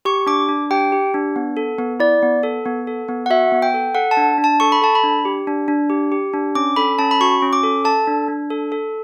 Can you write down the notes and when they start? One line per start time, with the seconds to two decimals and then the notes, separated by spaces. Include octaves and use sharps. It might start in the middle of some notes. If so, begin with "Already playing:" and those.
0.05 G4 C#6
0.26 D4 D6
0.49 D4
0.71 G4 G5
0.92 G4
1.14 D4
1.36 B3
1.57 A4
1.79 B3
2.00 E4 D5
2.22 B3
2.43 A4
2.65 B3
2.87 A4
3.08 B3
3.26 F#5
3.30 F#4 E5
3.52 B3
3.62 G5
3.74 A4
3.95 A4 F#5
4.11 A5
4.17 D4
4.38 D4
4.44 A5
4.60 A4 C#6
4.72 B5
4.82 A4 A5
4.95 B5
5.04 D4
5.25 G4
5.47 D4
5.68 D4
5.90 G4
6.12 G4
6.33 D4
6.55 C#4 D6
6.76 A4 B5
6.99 C#4 A5
7.11 B5
7.21 F#4 C#6
7.42 C#4
7.53 D6
7.63 A4
7.85 A4 A5
8.07 D4
8.28 D4
8.50 A4
8.72 A4